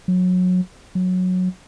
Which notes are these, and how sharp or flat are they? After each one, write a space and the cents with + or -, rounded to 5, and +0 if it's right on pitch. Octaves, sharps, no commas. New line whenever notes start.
F#3 -25
F#3 -15